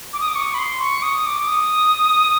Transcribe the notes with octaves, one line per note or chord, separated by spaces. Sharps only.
D6
D#6
D6
C#6
B5
C6
C#6
D#6
D6
D#6